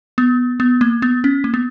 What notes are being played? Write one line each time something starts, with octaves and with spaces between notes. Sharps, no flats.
B3
B3
A#3
B3
C#4
A#3
B3